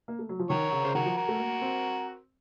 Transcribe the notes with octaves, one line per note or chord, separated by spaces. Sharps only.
A#3
A3
F#3
F3
D#3 A#4 C#5
C#3
C#3 C5
D#3 F#4 A#4
F3
F#4 A#4
A3
A#3
C4